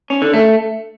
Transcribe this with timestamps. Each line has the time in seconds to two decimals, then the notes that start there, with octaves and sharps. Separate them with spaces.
0.10 C#4
0.22 D3
0.34 A3